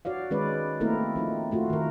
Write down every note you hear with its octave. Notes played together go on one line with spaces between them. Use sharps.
F#4 C#5 D5 F5
D#3 G#3 C#4 B4 D5
A3 A#3 C4 E4 A#4
F3 C4 D#4
A3 F4 F#4
D#3 A#4